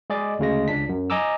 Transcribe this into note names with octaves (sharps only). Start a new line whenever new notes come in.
G#3 G#4 D5 D#5 D6
D2 C#3 G#3 A#6
C#2 D4 B6
F#2
D#5 G#5 A#5 D6 E6